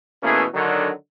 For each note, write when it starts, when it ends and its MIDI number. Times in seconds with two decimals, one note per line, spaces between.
0.23 0.44 47
0.23 0.44 52
0.23 0.44 57
0.23 0.44 58
0.23 0.44 61
0.23 0.44 68
0.54 0.90 50
0.54 0.90 51
0.54 0.90 54